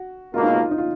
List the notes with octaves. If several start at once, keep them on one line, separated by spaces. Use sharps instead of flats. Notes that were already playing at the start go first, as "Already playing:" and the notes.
Already playing: F#4
C#2 B2 A#3 F4
D#4
F4
D#4
F4